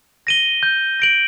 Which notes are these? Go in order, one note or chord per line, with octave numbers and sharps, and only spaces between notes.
A#6 D#7 G7
G6
A#6 D7 F#7